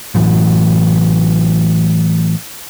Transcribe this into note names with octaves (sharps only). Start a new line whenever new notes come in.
A2 E3 F#3